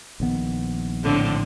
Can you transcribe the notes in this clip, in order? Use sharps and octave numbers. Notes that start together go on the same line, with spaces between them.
A#1 D#3 B3
A2 D3 C4